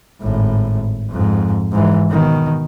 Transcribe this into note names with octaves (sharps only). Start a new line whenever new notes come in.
G#1 A2
F2 G#2
G#2 E3
B2 D#3